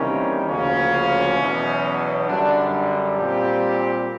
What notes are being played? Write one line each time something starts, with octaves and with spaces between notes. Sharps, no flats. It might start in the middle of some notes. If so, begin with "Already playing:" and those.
Already playing: E2 C3 D#3 G3 A#3 C#4
D2 C#3 F3 A#3 C#4
E2 B2 F#3
F#2 D3 G3 D4
A#2 G3 C4 G4